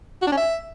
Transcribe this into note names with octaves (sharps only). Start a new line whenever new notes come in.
F#4
D4
C#4
E5